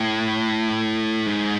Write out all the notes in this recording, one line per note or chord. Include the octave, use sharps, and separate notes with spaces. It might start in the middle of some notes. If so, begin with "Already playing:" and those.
Already playing: A2
G#2